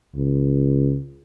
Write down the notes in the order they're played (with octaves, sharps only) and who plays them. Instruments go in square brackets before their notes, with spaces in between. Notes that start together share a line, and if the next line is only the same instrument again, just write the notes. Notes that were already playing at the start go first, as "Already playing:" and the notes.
[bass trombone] C#2